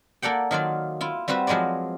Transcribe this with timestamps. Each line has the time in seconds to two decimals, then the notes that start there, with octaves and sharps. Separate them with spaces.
0.22 A#3 A4 D5 F#5 G5
0.51 D#3 F#3 F4 D5
1.01 E4 F4
1.28 G3 C4 F#4 B4 E5
1.47 F3 F#3 G#3 F4 D5